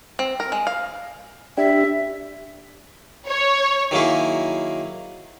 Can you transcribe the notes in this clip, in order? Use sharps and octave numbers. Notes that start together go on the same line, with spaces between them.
C4
A#4
G#3
F5
D4 G4 E5
C#5
D#3 F#3 A#3 E4 G#4